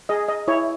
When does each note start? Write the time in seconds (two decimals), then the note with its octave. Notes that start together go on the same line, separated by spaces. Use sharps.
0.09 G#4 D#5
0.28 D#5
0.48 E4 C#5